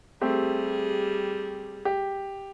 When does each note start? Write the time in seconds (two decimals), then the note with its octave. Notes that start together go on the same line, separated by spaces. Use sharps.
0.21 G3 A3 C4 G4 G#4
1.85 G4